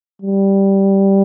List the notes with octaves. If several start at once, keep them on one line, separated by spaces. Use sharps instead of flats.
G3